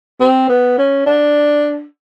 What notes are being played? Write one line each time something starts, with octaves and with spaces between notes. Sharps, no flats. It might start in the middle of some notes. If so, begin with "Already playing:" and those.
C4
B3
C#4
D4